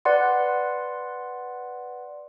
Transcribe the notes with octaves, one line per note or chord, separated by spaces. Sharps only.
B4 D5 F#5 C6